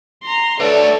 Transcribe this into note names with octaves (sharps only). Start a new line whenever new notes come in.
A#5 C6
A3 D4 A4 B4 C#5 D5 E5